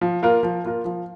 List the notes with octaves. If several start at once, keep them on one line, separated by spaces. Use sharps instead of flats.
F3
A#3 F4 A#4
F3
A#3 F4 A#4
F3